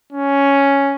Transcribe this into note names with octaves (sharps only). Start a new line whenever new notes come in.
C#4